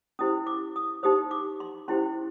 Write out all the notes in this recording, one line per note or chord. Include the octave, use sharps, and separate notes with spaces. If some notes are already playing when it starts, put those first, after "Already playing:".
C#4 E4 G4 C5 D#6
D6
D#6
D#4 G4 C5 D#6
D6
C6
C#4 E4 G4 C5 C6